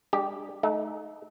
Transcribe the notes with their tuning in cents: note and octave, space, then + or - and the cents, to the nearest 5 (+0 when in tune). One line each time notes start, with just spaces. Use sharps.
G#3 -35 D4 +0 G4 +0
A3 -35 D#4 +0